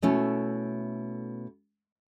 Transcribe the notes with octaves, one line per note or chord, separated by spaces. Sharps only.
B2 A3 C#4 E4